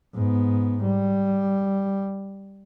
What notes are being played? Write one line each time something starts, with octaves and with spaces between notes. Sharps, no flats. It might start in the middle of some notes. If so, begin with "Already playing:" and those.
G#2 B3
G3